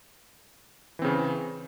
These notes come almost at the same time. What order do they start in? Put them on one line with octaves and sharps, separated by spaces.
E3 C4 C#3